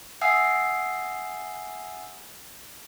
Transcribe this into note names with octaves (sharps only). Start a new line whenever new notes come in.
E5 F#5 G#5 D#6 E6 C7